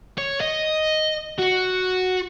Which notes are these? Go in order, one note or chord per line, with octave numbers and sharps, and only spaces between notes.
C#5
D#5
F#4